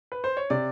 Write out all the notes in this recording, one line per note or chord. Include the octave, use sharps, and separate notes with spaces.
B4
C5
C#5
C3 D5